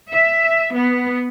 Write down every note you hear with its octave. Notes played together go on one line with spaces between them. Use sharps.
E5
B3